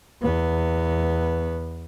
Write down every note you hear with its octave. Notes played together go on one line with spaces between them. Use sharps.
E2 B3